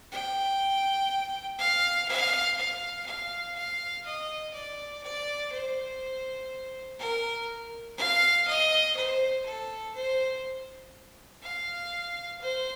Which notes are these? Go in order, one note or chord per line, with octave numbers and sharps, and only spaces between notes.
G5
F5
F5
F5
F5
F5
D#5
D5
D5
C5
A#4
F5
D#5
C5
A4
C5
F5
C5